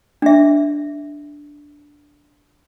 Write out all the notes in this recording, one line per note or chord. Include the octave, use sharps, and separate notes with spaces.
D4 E5